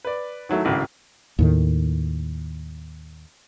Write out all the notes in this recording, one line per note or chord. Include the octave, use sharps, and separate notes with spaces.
B4 D5
D#3 F#3 A3 E4
G#1 C#2 A2 F#4
D#2 A2 D#3